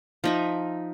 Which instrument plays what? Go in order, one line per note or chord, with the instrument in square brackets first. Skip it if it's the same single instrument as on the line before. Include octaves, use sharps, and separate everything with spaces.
[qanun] F3 D#4 E5